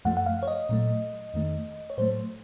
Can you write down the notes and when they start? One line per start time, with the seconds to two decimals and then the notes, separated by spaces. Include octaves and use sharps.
0.05 F#2 F3 A3 F#5
0.17 F#5
0.26 F5
0.43 C#5
0.48 D#5
0.69 A#2 F#3 A3
1.34 F2 D#3 A3
1.90 C#5
1.98 A2 F#3 A3 C5